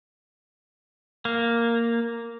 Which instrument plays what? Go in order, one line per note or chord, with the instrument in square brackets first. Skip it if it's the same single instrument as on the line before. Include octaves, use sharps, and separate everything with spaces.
[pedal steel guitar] A#3